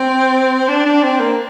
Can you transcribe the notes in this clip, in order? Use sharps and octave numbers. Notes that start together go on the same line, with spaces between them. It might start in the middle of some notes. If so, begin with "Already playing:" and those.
Already playing: C4
D4
D4
C4
A#3